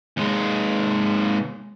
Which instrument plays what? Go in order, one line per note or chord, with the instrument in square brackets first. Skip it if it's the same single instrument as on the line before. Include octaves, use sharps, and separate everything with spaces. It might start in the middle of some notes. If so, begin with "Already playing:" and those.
[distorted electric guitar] D#2 G#3